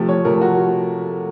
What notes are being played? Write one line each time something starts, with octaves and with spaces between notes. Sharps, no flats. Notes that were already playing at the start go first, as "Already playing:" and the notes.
Already playing: C3 F3 A3
C#5
C3 F3 A3 A#4
F#4